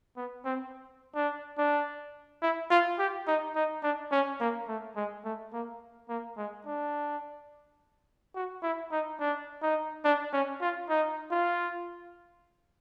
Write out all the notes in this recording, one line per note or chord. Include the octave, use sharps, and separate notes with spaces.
B3
C4
D4
D4
E4
F4
G4
D#4
D#4
D4
C#4
A#3
A3
G#3
A3
A#3
A#3
G#3
D4
F#4
E4
D#4
D4
D#4
D4
C#4
F4
D#4
F4